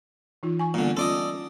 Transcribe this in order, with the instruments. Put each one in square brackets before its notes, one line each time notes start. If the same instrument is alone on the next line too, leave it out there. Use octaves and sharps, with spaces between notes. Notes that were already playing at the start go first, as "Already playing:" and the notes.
[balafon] E3 D#4 F4
G#5 C#6
[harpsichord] A#2 D3 [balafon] G3 A3 B3
[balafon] C#4 F4 [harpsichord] A4 D5 D#5